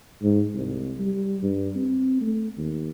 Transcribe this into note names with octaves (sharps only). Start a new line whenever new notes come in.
G#2
C2
G3
G2
C4
A3
D#2